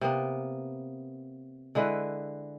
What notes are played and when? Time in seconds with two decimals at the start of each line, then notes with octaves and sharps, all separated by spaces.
0.01 C3 A#3 B3
1.75 D3 G#3 E4 B4